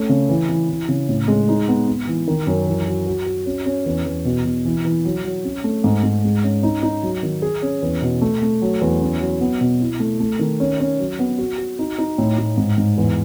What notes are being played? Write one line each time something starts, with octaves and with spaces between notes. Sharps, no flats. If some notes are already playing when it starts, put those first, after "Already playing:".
Already playing: A3 C#4
C#3
E3
E3
E3
C#3
A2
G#3
D#4
B3
B3
E3
D#3
F#2
E3
F#4
F#4
F#4
C#4
C#4
E2
E2
B2
B2
E3
E3
F#3
F#3
C#4
A3
G#2
G#2
G#3
C#4
D#4
D#4
F#3
D#3
G#4
C#4
E2
B2
A3
A3
F#3
E2
C#4
F#3
B3
B2
E4
A3
A3
D#3
C#4
C#4
F#3
B3
F#4
F#4
D#4
D#4
A2
A2
G#2
G#2
E2